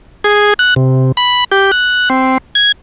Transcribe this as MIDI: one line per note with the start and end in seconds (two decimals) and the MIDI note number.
0.24 0.54 68
0.59 0.74 90
0.76 1.12 48
1.17 1.44 83
1.52 1.71 67
1.72 2.09 90
2.10 2.38 60
2.55 2.72 92